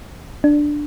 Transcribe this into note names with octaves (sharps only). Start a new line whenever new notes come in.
D4